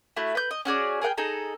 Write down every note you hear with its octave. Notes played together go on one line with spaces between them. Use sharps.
A3 E4 F#4
B4 G6
D#5
C#4 F#4 G#4 D5
G#4 A#4 F#5 G5
D#4 G#4 A4 A#5